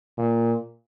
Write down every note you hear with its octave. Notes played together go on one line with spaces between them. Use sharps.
A#2